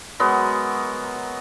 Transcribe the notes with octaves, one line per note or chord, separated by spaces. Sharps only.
F#3 G#3 B3 A#4